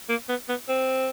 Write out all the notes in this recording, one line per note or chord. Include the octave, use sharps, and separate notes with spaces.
A#3
B3
B3
C4